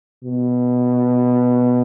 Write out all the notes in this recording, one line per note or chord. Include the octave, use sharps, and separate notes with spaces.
B2